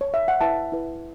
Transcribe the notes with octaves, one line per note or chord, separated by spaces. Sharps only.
C#5
E5
F#5
E4 B4 E5 A5
E4 B4